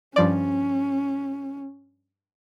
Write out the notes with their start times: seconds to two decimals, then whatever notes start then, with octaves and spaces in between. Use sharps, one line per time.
0.16 G2 F3 C#4 D5